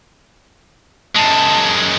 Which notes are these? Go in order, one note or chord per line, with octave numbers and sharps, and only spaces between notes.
F#2 G#3 A5